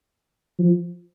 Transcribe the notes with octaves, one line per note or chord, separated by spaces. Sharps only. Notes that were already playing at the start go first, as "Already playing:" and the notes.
F3